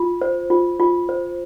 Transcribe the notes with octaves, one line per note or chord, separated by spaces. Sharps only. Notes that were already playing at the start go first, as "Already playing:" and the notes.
Already playing: F4
C5
F4
F4
C5